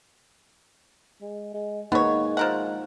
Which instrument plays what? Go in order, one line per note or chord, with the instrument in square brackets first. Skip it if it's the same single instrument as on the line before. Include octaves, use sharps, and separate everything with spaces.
[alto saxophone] G#3
G#3
[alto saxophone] G#3 [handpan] A#3 D#4 [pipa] B3 C#5
[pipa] F3 A#4 F#5